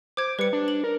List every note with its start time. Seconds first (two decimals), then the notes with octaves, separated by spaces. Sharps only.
0.17 C5 D6 G#6
0.39 G3 B4 C#7
0.53 D4
0.68 F#7
0.84 A#4